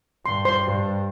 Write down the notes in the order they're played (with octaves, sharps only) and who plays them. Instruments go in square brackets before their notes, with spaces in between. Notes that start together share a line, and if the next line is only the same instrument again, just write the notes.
[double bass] G2 [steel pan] C6
[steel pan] C5 C6
[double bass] G2